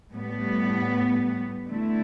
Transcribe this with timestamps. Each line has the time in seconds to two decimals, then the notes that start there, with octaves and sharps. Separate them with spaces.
0.13 A2 G3 B3
1.67 D3 A3 E4